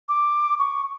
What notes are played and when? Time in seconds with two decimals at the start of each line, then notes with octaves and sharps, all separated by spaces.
0.09 D6
0.59 C#6